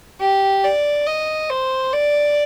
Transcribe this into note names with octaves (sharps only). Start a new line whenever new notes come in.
G4
D5
D#5
C5
D5